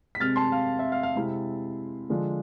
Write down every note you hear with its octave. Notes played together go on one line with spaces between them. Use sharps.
B6
C3 G#3 C4 F6 A6
A5 C6
F5
E5
F5
F5
C3 G#3 C4 E4
D3 F3 G#3 D4 F4